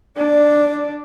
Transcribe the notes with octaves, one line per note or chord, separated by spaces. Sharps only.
D4 D5